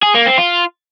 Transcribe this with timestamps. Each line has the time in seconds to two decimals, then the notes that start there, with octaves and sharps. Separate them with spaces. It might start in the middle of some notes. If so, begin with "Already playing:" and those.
0.03 G#4
0.15 A#3
0.27 C4
0.38 F4